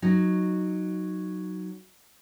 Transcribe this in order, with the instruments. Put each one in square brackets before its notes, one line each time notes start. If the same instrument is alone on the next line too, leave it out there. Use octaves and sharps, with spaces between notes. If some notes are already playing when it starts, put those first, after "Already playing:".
[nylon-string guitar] F#3 D#4